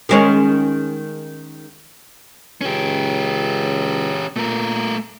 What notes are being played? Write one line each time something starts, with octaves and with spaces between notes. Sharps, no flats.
D#3 G#3 C#4
C#2 C#4 G4
A#2 A3 A#4